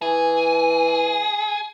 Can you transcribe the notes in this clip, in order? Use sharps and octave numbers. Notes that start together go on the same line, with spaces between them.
E3 G#4